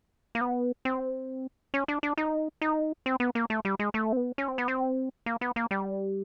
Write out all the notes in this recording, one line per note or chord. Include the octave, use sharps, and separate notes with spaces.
A#3
B3
C4
C#4
D4
D4
D#4
D#4
C4
B3
A#3
A3
G3
G#3
A3
C4
B3
C#4
C4
B3
C4
A#3
B3
A#3
G3